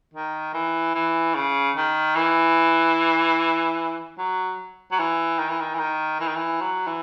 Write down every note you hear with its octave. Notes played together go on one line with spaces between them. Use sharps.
D#3
E3
E3
C#3
D#3
E3
F#3
F#3
E3
D#3
E3
D#3
E3
D#3
E3
D#3
E3
F#3
E3